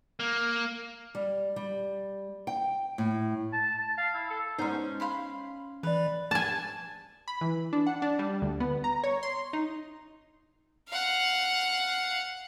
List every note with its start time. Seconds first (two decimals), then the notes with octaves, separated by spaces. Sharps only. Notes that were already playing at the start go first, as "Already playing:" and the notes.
0.20 A#3
1.15 G3
1.56 G3
2.47 G5
2.98 A2
3.53 A5
3.79 A5
3.98 F5
4.14 E4
4.30 A4
4.59 G#3 B3 C#4 D#4 C5
5.00 F5 B5 C6
5.83 E3 B4 D5
6.31 G#5 A5
7.28 B5
7.41 E3
7.73 D4
7.87 F#5
8.02 D4
8.19 G3
8.42 D2
8.60 B3
8.84 A#5
9.04 C#5
9.23 C6
9.53 D#4
10.88 F5 F#5